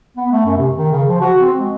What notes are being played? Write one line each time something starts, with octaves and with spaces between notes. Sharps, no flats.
B3
A3
F#2
C3
D#3
C#3
F3
F#4
C4
G#3